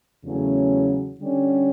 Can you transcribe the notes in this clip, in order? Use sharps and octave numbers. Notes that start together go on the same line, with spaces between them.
E2 C#3 F#3 A3 C#4
D3 G3 C#4